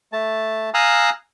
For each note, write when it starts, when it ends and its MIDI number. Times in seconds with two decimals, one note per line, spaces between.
0.13 0.70 57
0.13 0.70 81
0.74 1.10 77
0.74 1.10 80
0.74 1.10 82
0.74 1.10 87
0.74 1.10 88
0.74 1.10 90